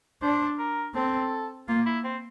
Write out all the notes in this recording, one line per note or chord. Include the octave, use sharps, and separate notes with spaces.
D4 C5
A#4
C4 A4
A#3 F4
E4
C4